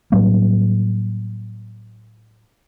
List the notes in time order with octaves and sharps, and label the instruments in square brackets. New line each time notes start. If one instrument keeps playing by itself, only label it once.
[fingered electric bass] A2 F#3 G3 A#3